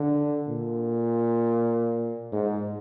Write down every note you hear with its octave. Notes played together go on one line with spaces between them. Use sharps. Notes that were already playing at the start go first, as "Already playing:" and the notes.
Already playing: D3
A#2
G#2